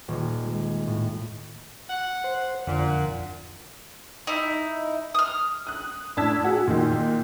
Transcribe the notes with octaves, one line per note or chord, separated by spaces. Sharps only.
D#1
G#3
A2
F#5
C5
F2 A#2 D3 F#5
D#4 E4
D#6 F6
D#6 F#6
A2 D4 A5 E6 G#6 B6
F#4 G#4
A#2 D#3